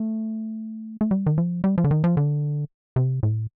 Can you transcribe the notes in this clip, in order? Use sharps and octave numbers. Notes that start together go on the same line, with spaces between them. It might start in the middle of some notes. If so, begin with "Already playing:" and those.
Already playing: A3
A3
G3
D#3
F3
G3
F3
D3
D#3
F3
D3
C3
A2